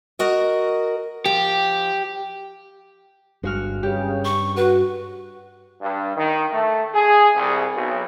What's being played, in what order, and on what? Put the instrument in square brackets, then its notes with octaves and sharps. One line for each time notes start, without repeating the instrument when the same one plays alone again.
[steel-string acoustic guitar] F#4 A#4 D#5
[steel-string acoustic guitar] F3 [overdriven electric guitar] G4
[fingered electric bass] G1 G2 [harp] G#3 F#4 F6
[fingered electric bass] G2 [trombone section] C#3 [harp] G4
[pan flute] C#6
[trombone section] F#4 [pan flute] B4
[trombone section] G2
D#3
A3
G#4
C2
B1